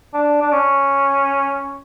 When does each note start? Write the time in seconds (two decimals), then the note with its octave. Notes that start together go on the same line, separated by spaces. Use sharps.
0.14 D4
0.41 D4
0.52 C#4